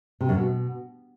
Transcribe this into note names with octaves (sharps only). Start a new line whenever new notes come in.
C3
F#2
B2